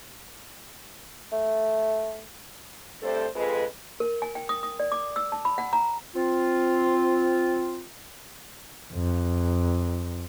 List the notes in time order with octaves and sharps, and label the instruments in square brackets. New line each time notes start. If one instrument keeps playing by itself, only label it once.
[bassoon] A3
[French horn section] G2 A3 C4 A4 C5
F2 G#3 B4
[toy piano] A#4
G#5
G5
D#6
D#6
D5
D6
E6
A5
B5
F#5
A#5
[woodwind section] C4 F4
[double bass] F2